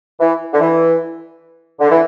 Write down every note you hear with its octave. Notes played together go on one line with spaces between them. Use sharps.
E3
D3
E3
D3
E3